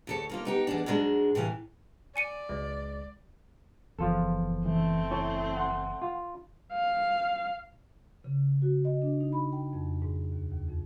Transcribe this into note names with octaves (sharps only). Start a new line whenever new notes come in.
D2 A4 C#5
D#3 A#3 F4
B3 D#4 G4
E2 G#3 D4
G#2 F#3 G#3 D4
A2 C3 E3 F5
D5 G#5 C#7 D#7
C#2 G#3
F#1 E2 F3 F4 A4
E3 A3 C4
E4 C#5 G#5 A5
F#5 C6
F4
F5
C#3
F#4
D#5
D4
D#4
B5
G5
F2
G#2
D#2
D#2
F2